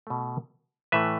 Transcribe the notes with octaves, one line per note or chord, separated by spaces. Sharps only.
B2 A3
A2 E3 A3 B4 E5